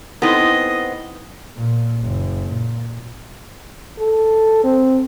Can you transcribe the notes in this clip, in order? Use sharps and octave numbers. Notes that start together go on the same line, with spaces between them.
B3 C4 D#4 E4 A4 D#5
A#2
F#1
A#2
A4
C4